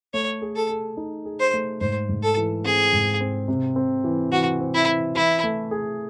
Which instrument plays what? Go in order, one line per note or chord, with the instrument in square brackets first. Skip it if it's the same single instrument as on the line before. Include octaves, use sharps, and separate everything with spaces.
[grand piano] A3 [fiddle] C#5
[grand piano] G#4
[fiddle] A4
[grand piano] G#4
D#4
G#4
[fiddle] C5
[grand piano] A3
[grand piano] G#2 [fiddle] C5
[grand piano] G#2
[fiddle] A4
[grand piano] E3
[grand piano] C4 [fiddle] G#4
[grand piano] G#2
C4
C3
C4
E3
[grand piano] E3 [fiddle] F#4
[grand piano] C4
[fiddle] E4
[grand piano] E3
[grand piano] E3 [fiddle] E4
[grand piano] A3
G#4